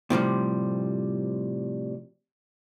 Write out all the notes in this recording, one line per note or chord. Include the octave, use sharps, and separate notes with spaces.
A2 C3 F3 G3